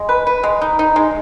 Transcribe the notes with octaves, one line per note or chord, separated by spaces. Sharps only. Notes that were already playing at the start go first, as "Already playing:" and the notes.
Already playing: G#3
B4
B4
G#3
D#4
D#4
G#3